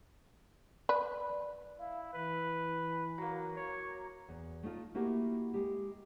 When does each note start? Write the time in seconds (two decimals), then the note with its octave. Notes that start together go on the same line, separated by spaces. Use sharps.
0.89 B4 D5
1.79 E4 F5
2.13 E3 B4
3.18 F#3 A#3
3.57 C#5
4.28 E2
4.63 A3 D#4 F4
4.94 A3 A#3 E4 F#4 G4 A#4
5.54 G#3 G4